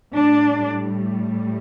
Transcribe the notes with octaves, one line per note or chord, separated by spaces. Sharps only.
A2 G3 D4